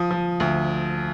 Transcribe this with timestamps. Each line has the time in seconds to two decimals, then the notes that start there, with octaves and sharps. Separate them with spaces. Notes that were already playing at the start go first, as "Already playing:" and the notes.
Already playing: F3 D#6
0.11 F3
0.40 D2